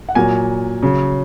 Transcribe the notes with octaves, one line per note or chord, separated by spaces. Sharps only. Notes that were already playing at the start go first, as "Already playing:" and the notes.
F#5
A#2 F#3 G#5
C#3 F#3